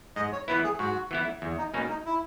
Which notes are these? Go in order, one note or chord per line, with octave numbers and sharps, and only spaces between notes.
G#2 D#5
C#5
E3 B3 E4 B4
G#4
G#2 F#4
E3 B3 E4
E2
D#4
B2 A#3 C#4 D#4
D#4
E4